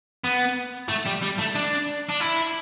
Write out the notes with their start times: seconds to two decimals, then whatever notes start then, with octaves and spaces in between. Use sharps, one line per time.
0.24 B3
0.89 A3
1.06 G3
1.22 G3
1.39 A3
1.55 D4
2.09 D4
2.20 E4